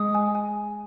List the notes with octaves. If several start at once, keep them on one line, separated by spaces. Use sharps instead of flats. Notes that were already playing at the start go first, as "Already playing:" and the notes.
Already playing: G#3 D#6
G#5
G#5